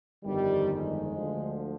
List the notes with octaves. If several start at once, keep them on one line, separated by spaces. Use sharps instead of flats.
G1 F2 D#3 G3
G#3
D2 D3 F3